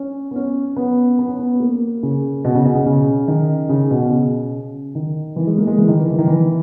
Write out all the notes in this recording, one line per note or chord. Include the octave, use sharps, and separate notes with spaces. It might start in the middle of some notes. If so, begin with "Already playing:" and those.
Already playing: C#4
B3
C#4
B3
B3
C#4
B3
A#3
C#3
B2
C#3
B2
C#3
C#3
D#3
C#3
B2
C#3
D#3
E3
G#3
A#3
G#3
E3
D#3
E3
E3
D#3
E3